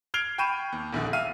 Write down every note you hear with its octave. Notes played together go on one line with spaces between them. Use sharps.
F6 G#6 C7 D7 F7 G7
G5 B5 C#6 G6 D#7 E7
D#2
D#1 A#1 D#2 D3
E5 F5 F6 D#7